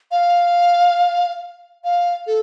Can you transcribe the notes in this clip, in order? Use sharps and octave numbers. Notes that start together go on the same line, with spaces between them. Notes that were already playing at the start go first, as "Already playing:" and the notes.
F5
F5
A4